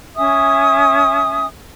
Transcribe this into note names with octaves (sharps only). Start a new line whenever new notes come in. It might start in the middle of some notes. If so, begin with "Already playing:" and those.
C#4 E5 G#5 D#6